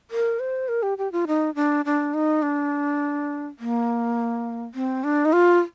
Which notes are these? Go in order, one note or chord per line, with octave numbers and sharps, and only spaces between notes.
A#4
C5
A#4
G4
G4
F4
D#4
D4
D4
D#4
D4
A#3
C4
D4
D#4
F4